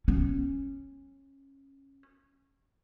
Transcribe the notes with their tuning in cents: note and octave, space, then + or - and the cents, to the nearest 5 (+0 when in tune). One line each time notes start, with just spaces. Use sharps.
C#4 -20